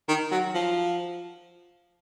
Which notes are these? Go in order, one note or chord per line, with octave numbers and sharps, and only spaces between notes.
D#3
F#3
F3